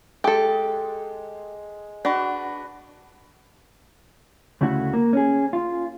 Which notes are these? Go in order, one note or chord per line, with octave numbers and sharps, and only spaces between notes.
G#3 G4 A4
D4 F#4 B4
D2 C#3 A3 E4 F#4
A#3
C#4 G#4
F4